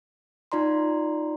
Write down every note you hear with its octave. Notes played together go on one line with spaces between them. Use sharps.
D#4 F4 D5 A#5 C6